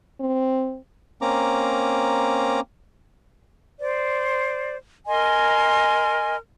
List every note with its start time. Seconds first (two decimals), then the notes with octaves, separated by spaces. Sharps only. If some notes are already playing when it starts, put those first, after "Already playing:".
0.20 C4
1.22 A#3 C4 C#4 A#5 D6
3.79 C5 D5
5.07 A#4 D#5 G#5 C6